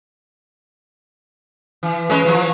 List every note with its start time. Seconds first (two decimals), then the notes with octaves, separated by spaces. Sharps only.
1.83 E3
2.09 G#3 C#4 B4
2.25 E3 F3